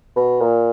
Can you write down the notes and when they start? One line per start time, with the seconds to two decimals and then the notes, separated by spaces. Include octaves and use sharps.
0.16 B2
0.41 A#2